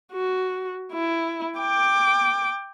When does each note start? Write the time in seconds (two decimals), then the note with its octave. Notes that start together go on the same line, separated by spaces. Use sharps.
0.13 F#4
0.93 E4
1.60 G5 D6